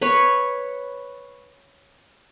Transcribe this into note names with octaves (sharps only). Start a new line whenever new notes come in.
B4 C#5 C#6